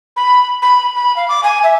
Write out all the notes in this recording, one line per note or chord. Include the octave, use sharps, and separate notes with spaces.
B5
B5
B5
F5
D6
G#5
E5